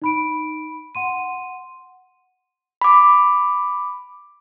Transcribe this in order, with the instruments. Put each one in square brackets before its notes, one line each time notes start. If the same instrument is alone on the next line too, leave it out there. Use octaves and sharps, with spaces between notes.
[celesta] D#4 B5 D7
F#5 C6 D#7
[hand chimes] B5 D6